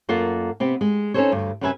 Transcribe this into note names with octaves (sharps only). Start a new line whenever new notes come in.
F#2 A#3 F4 A4 F#5
C3 B3 C4
G#3
C#4 D#4 G4 A4 C5 C#5
D2 G2
F#2 C3 C#4 B4 E5 G#5